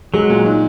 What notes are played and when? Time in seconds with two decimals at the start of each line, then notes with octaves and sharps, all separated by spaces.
0.14 F#3 G#3
0.30 A#2
0.46 D#4